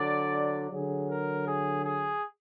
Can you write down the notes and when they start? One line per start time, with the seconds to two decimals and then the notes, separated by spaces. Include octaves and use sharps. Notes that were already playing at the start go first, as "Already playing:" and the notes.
Already playing: D3 F#3 D5
0.71 D3 F#3 G#4
1.09 A#4
1.46 G#4
1.84 G#4